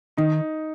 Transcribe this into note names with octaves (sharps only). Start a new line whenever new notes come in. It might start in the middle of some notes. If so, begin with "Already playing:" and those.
D#3 D#4